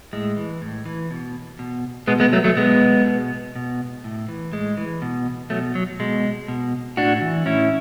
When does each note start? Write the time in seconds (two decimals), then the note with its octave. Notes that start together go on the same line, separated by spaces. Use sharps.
0.13 A2 G#3
0.37 E3
0.62 A2
0.86 E3
1.11 B2
1.59 B2
2.08 B2 G#3 B3
2.20 G#3 B3
2.33 F#3 A3
2.44 F#3 A3
2.57 B2 G#3 B3
3.06 B2
3.56 B2
4.04 A2
4.28 E3
4.52 A2 G#3
4.77 E3
5.02 B2
5.50 B2 F#3 A3
5.75 F#3
6.00 B2 G#3
6.48 B2
6.97 A2 D4 F#4
7.22 E3
7.46 A2 C#4 E4